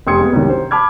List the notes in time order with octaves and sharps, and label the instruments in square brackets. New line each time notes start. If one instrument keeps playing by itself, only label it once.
[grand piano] F1 G4 C6 D#6 G#6 C#7
G#3 B3
C2 F#2 D#3
C5
A5 B5 D6 F6 G#6